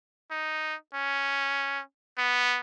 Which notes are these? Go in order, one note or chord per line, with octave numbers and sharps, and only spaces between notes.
D#4
C#4
B3